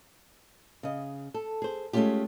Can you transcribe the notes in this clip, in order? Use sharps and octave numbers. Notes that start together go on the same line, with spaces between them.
C#3 D#5
A4
G#4 C5
G#3 A3 C4 C#4 F4 G4